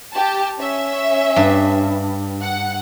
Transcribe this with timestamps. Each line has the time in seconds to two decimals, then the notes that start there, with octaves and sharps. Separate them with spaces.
0.14 G4 A5
0.59 C#4 E5
1.36 G2
2.42 F#5